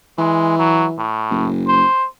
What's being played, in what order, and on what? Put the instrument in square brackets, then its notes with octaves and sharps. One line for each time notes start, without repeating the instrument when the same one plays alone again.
[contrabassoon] E3 [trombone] G#3
[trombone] F#3
A2
[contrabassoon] F#1
[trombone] C5